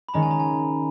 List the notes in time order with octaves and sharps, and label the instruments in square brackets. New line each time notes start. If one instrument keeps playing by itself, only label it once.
[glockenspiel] B5
[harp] D#3 G#3 C#4 [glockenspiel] A#5
[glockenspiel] G#5
A#5
G#5